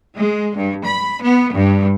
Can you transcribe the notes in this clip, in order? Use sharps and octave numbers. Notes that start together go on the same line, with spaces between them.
G#3
G2
B5
B3
G2